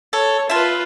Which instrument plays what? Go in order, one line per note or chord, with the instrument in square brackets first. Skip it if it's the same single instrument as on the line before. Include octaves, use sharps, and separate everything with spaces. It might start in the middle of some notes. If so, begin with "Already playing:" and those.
[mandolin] A4 [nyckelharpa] C#5
[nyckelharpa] F4 B4 [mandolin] E5 A5